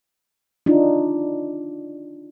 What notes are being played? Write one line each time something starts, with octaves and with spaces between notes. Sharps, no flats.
D4 D#4 F4